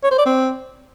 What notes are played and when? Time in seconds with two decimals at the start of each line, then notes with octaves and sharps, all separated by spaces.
0.03 C#5
0.11 C5
0.18 D5
0.26 C4